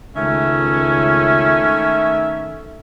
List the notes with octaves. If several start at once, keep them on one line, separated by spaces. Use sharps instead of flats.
C#2 D#3 A3 C#4 E5